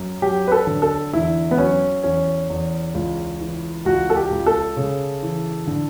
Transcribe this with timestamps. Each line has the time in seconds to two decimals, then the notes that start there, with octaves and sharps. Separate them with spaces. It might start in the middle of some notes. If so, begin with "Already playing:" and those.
Already playing: F#2
0.22 F#3 G4
0.47 B4
0.52 A4
0.67 D3
0.82 A4
1.13 E2 E4
1.51 B3
1.58 F#3 C#4
2.03 E2 C#4
2.50 E2
2.94 C#2
3.40 E3
3.85 C#2 F#4
4.10 A4
4.16 G4
4.31 C#2
4.46 A4
4.77 C#3
5.22 E3
5.67 D3